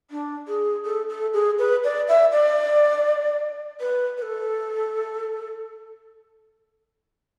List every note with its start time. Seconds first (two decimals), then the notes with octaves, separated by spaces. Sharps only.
0.11 D4
0.48 G#4
0.85 A4
1.09 A4
1.34 G#4
1.59 B4
1.84 D5
2.08 E5
2.32 D5
3.80 B4
4.18 B4
4.22 A4